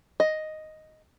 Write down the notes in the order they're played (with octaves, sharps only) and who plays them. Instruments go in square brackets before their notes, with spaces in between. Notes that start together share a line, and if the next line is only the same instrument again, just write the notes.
[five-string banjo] D#5